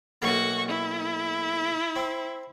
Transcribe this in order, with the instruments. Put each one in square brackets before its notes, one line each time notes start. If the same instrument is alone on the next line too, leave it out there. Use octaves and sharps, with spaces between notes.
[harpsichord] B1 A3 A#3 [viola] F#4 C#6
[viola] E4
[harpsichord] C4